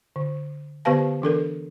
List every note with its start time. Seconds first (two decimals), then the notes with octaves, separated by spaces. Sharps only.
0.16 D3
0.85 D3 B3 G4 B4 F5 A5
1.22 E3 D4 A4 A#4